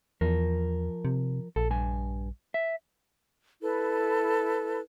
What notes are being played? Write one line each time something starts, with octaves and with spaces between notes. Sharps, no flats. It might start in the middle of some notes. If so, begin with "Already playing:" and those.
E2 F3 A#4
C3
A#1 A4
G2 G#5
E5
E4 A4 B4